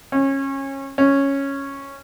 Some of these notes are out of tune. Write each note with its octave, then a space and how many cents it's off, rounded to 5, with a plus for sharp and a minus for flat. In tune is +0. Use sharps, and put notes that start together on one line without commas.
C#4 -25
C#4 -5